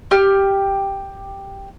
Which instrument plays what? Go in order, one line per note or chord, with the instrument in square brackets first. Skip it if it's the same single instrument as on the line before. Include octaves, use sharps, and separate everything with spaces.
[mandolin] G4 F6